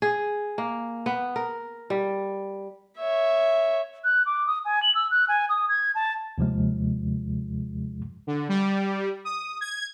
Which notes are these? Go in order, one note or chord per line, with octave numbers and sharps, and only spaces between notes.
G#4
A#3
B3
A#4
G3
C#5 E5
F#6
D6
D#6
G#5
F#7
E6
F#6
G#5
D#6
G#6
A5
D#2 C3 F3 G#3
D3
G3
D#6
G#6